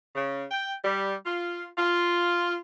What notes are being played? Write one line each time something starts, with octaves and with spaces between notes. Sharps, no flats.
C#3
G5
G3
F4
F4